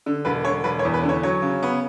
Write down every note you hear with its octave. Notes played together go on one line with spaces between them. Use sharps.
D3
E1 B4
D3 C#5
E1 B4
C#5
E2
B4
D3
C#5
F#3 C#5
C#3
B3